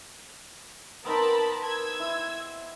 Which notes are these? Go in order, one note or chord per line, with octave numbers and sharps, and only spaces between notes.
B3 C4 D#4 A#4 A5 B5
E6 G#6
E4